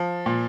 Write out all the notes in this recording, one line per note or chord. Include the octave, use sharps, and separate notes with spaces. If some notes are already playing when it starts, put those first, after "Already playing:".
Already playing: F3
A#2